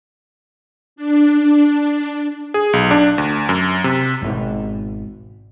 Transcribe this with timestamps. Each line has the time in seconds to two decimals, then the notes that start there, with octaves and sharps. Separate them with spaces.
0.96 D4
2.54 G#4
2.73 B1
2.91 D4
3.18 D2
3.49 F#2
3.84 C3
4.22 G#1 B2